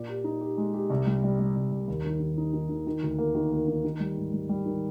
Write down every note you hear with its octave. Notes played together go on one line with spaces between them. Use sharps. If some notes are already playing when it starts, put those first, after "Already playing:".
Already playing: A#2 D5
G4
D#4
G4
G#3
G4
C2
G3
G3
G3
C2
C2
D#2
D#3
D#3
D#4
D#3
D#3
D#3
D2
A#3
D#3
A#3
D#3
D#3
G3
G#2
G3
G3
D#3